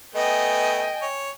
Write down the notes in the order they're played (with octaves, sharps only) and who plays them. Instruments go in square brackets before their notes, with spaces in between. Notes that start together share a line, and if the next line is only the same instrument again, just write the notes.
[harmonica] A3 B3 [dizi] D#5 [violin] G5 G#5
[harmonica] C#5